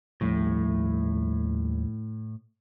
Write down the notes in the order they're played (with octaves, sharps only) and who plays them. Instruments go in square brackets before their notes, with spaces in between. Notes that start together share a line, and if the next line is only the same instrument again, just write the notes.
[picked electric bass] D#2 F3 G3 [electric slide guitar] A2